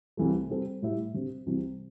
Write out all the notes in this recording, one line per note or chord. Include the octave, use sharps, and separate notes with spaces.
C2 C3 E3 A3
G3 C4 A4
A2 G3 E4 G4 E5
D3 C4 G4
C2 C3 E3